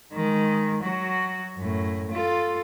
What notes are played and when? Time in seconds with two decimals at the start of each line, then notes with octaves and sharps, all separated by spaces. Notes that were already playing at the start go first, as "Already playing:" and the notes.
0.13 D#3 G#3
0.83 F#3 F#4
1.56 F#2 A2
2.11 F4 A4